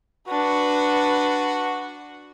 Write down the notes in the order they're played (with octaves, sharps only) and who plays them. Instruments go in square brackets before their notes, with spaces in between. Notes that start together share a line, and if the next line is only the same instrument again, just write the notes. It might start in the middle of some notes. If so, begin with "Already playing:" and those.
[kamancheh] D4 B4 [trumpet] F#4